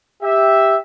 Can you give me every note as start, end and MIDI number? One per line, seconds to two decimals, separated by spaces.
0.22 0.75 67
0.22 0.75 76